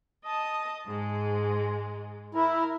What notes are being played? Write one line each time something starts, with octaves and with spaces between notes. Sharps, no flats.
D#5 A5 D#6
G#2 G#3
E4 A#4